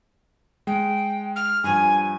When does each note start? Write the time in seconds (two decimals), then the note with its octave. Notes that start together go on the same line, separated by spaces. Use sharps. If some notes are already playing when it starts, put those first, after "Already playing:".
0.67 G#3 G5
1.36 F6
1.64 G2 F3 G#5